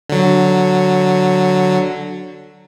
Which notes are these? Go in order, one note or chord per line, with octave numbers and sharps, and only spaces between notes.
D3 F#3